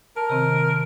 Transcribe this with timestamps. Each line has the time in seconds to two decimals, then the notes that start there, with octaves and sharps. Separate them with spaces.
0.16 A#4 A5
0.30 C3 D#3 C4